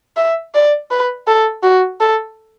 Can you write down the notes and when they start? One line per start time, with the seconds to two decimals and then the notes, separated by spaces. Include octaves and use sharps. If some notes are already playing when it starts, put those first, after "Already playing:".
0.17 E5
0.54 D5
0.91 B4
1.28 A4
1.63 F#4
2.00 A4